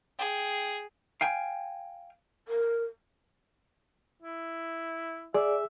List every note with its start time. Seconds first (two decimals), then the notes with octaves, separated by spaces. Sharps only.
0.19 G#4 G5
1.21 F5 G5 G#5
2.48 A#4
4.22 E4
5.34 G#4 D5 E5